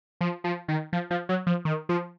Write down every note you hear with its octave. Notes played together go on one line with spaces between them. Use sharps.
F3
F3
D#3
F3
F3
F#3
F3
D#3
F3